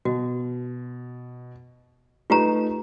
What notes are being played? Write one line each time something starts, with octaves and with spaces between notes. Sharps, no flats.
B2 F#4
A3 D#4 F4 G4 B4 A#5